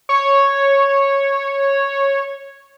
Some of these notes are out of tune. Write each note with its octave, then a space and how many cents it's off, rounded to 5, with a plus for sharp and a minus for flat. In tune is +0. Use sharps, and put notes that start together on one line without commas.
C#5 -5